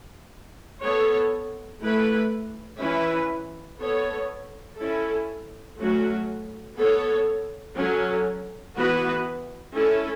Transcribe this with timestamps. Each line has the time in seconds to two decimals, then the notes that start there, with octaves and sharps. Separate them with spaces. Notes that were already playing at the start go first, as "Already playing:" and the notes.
0.81 B3 A4 C#5
1.80 A3 E4 B4
2.79 E3 C#4 E4 B4
3.79 B3 A4 C#5
4.77 C#4 E4 A4
5.77 F#3 A3 C#4 F#4
6.77 B3 A4 C#5
7.76 F#3 C#4 A4
8.75 E3 B3 F#4 B4
9.74 C#4 E4 A4